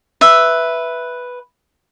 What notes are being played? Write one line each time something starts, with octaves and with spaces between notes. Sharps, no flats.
B4 E5